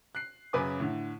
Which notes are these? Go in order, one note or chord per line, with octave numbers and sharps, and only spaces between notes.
F#6 C7
F#2 C#3 B4 G#5 D6
A2 D3